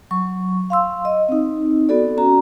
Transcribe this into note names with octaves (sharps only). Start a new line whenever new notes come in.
F#3 C#6
F5 C6 E6
D#5
C4 D#4
B3 F#4 A4 D5
C#4 F#4 A#5